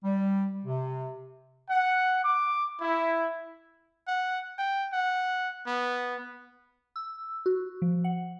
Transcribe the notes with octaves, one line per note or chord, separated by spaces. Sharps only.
G3
C3
F#5
D6
E4
F#5
G5
F#5
B3
E6
F#4
F3
F#5